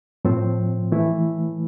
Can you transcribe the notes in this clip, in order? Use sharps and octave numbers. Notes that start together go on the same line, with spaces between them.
A2 F3 C4
E3 A3 E4